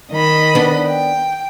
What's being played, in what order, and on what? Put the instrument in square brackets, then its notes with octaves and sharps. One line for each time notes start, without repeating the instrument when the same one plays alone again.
[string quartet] D#3 D#5 B5
[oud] B3 D4
[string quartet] G5